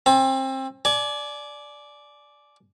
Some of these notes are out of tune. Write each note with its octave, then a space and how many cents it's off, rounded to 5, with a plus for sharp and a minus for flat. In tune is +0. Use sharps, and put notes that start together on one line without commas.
C4 +25 A5 -40
D5 +0 G#5 +35